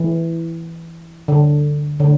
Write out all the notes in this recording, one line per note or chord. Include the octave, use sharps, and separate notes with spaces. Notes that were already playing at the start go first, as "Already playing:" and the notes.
Already playing: E3
D3
D3